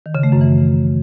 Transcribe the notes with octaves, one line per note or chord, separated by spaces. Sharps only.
D#3
C#3
A3
F#2
E3